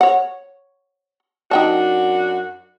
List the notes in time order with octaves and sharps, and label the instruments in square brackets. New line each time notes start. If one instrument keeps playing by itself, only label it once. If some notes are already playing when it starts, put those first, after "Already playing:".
[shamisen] C#5 F#5
[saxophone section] F#2 D4 F#4 [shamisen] D#4 G5 A5